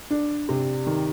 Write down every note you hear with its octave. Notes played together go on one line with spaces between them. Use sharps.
D4
C3
D#3